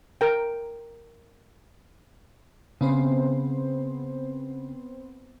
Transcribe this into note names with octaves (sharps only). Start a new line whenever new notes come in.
A#4 G5
C#3 B3 C4 C5